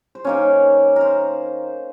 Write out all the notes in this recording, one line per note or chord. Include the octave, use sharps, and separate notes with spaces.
C5
D#3 A#3 C#4 C#5
A#4 C5